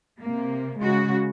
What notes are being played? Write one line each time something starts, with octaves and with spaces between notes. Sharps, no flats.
C3 A#3
C#3 G#3 F#4